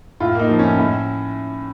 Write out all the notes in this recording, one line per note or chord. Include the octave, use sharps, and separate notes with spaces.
A2 F4
A#3 D#4
F3
C#4
A2
A2